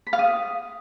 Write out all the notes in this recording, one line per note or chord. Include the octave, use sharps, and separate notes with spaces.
B5
F5
D#6